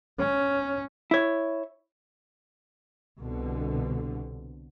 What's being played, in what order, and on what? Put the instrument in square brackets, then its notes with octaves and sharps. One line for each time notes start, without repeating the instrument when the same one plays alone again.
[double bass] C#4
[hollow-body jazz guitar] E4 C#5
[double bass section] C2 B2 D3